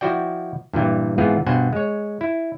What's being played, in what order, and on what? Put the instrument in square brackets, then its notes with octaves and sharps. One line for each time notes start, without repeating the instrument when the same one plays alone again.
[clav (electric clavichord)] F3 E4 F#4 D5 G5
G2 A#2 E3 G3
G#2 E3 B3 C4 F4 G#4
G2 B2 C5 F#5 G#5
G#3 C#5
E4